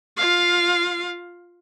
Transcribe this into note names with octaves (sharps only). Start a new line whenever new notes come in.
F4 F5